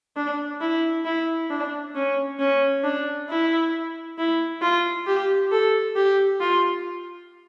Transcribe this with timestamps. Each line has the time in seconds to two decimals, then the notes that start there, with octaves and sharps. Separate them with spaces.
0.16 D4
0.61 E4
1.05 E4
1.50 D4
1.95 C#4
2.39 C#4
2.83 D4
3.29 E4
4.18 E4
4.62 F4
5.07 G4
5.52 A4
5.96 G4
6.41 F4